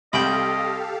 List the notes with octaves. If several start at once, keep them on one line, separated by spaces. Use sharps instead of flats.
C2 G4 A4 D#5 F5 G5 B5